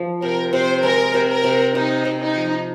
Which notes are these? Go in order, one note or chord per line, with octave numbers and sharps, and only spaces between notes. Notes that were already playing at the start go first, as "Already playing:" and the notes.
Already playing: F3
C3 A#4
C3 C5
G#3 A#4
C3
A#4
C3
C3 D#4
C3
D#4
F3